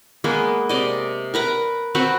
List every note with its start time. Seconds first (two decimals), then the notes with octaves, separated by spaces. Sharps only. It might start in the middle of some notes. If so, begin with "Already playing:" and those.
0.24 G#3 A#3 B3
0.69 C3 D5 D#5
1.34 A#4 B4 A#5
1.95 C4 F#4 B4 A#5